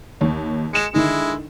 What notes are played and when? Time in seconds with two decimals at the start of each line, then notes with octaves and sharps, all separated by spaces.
0.21 D#2 C#5
0.73 G#3 C#7 E7
0.94 D3 D#3 G#3 D#4 E4